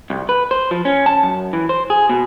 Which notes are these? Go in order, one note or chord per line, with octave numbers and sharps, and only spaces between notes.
C2
B4
C5
F3
C#4
A5
F#2
E3
C5
G#4
B2